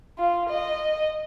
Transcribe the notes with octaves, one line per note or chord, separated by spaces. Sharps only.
F4
D#5